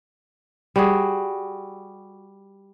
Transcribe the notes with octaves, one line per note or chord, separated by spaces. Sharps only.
G3 F#4 G#4